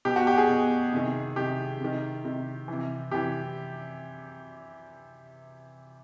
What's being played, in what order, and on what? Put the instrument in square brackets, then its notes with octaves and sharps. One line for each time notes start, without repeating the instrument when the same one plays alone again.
[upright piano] B2 G4
F#4
G4
G#4
B2
C3 D#3
C3 D#3 G4
C3 D#3
C3 D#3
C3 E3
C3 E3 G4